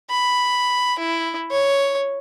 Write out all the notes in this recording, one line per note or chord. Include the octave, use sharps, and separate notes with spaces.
B5
E4
C#5